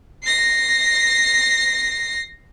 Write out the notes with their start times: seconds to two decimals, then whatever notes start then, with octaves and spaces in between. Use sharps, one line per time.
0.23 A#6 C7